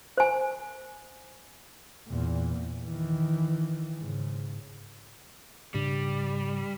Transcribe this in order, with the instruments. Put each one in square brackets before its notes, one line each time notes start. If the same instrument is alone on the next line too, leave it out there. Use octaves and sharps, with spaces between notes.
[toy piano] C5 G#5
[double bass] E2 A#2
D#3 E3
G#2 C#3
[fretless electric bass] G#2 C#3 D4 [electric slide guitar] G3